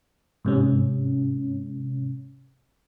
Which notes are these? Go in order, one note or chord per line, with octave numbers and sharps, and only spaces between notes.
G#2 C3 C#4